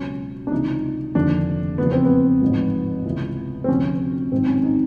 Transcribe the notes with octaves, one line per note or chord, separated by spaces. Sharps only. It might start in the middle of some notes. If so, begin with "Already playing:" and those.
Already playing: C#2 B2 F#3 C#4
D4
C#2 C3 E3 D#4
F1 D#2 D3 F3 D4
E2 C#3 F3 B3
C4
B3
A1 G#2 F3
C#2 C3 E3
C4
D2 C3 F3 C#4
A1 G#2 D#3 F#3 C4
C#4
D#4